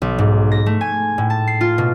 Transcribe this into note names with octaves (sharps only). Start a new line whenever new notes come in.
B1
G#2
A#6
A3
G#5
A2
A5
C7
F4
B2